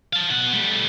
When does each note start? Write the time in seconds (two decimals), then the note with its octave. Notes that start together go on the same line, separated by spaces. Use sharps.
0.13 F5 A5
0.31 B2 F#5
0.53 G3 A3